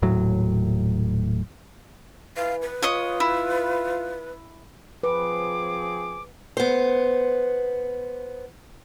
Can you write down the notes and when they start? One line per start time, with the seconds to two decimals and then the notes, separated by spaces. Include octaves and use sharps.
0.02 D#1 A2 F#3
2.37 E3 F5
2.62 B4
2.83 F4 C#5 D#5 D#6
3.20 E4
5.03 F3 C4 G#4 B4 D6
6.57 B3 C5